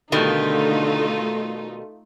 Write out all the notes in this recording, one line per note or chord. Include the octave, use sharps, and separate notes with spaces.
B2 D3 D#3 G3 A3 D#4 F4